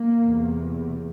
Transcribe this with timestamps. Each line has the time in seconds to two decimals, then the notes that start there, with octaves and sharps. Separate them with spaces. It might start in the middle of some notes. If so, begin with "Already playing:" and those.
Already playing: A#3
0.21 E2 C3